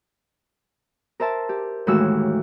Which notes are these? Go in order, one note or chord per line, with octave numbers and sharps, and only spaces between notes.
A#4 C5 E5 A5
G4
D#2 A2 E3 G#3 F#4 E6